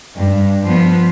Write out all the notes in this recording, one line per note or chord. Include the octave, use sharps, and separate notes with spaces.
G2
F3 B3